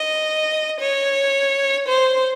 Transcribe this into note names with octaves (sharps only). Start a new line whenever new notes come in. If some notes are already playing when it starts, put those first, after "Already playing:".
Already playing: D#5
C#5
C5